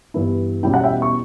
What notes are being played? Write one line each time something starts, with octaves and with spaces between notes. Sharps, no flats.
G2 E3 B3 E4
E2 B2 G3 C#4 E4 G5
F#5
E5 G5
C#6